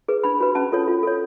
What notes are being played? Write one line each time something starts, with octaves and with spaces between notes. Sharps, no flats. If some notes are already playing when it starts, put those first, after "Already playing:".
G#4 B4
D4 B5
F#4 B4
C#4 A5
F4 A4 C#5
F4
A4 C#5